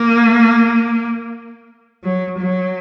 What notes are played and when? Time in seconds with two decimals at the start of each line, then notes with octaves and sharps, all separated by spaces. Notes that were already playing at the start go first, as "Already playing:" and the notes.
Already playing: A#3
2.04 F#3
2.38 F#3